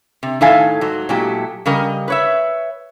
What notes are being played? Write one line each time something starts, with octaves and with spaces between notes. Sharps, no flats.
C3
A2 D#3 A4 E5 F5 G#5
G#2 F#3
A#2 F#3 G#3 A3 E4 G4
C#3 G3 A#4 D#5
B4 C#5 E5